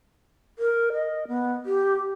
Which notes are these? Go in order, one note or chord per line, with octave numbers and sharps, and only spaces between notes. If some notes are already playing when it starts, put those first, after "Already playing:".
A#4
D#5
B3
G4